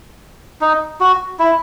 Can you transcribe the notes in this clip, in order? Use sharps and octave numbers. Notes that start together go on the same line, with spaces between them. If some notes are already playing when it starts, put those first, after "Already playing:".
D#4
F#4
E4